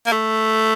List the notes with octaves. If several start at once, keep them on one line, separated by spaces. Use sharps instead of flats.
A#3
A3